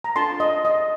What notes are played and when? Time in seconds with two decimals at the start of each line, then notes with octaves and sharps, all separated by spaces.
0.04 A#5
0.16 D4 F4 A4 A5 C6
0.40 D#5
0.65 D#5